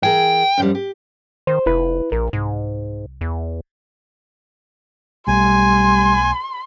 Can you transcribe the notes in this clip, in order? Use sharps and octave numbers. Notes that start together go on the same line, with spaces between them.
E3 G#4 A#4 G5
F#2 F3 G3
G4
D#3 C5
F1 E4 B4
A#1 A#4
C2 G#2
E2
B1 G3 A3 G#5 C6